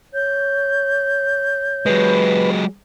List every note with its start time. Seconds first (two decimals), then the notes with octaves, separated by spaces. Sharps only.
0.14 C#5 G6
1.86 F#3 G#3 B4